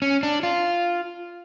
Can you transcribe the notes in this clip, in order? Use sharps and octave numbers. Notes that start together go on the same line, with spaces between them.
C#4
D4
F4